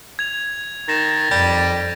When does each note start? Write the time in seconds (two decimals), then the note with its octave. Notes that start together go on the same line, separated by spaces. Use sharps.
0.19 G#6 F7
0.88 D#3 A6 A#6 E7
1.31 F2 G3